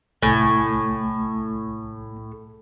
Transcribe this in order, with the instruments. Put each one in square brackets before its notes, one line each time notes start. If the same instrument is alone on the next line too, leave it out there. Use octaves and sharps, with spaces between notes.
[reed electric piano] C2 A3 G#5 [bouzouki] A2